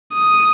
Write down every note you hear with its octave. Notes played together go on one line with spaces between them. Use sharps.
D#6